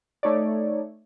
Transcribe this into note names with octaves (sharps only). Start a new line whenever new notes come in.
A3 D#4 C#5 D5